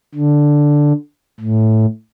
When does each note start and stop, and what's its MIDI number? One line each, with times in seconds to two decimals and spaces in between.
0.14 0.92 50
1.40 1.86 45